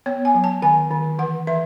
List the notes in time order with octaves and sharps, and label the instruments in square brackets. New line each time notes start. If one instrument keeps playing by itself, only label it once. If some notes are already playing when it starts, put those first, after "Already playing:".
[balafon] B3 C#5
G#5
F#3
A5
D#3 G#5
D#3
E3 F#5
E3 E5